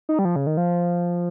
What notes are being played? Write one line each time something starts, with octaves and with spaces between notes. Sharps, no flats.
D#4
G3
F3
C#3
D#3
F3